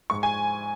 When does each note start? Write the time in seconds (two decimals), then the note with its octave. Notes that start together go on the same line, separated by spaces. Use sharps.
0.10 G#2 C#6
0.23 G#5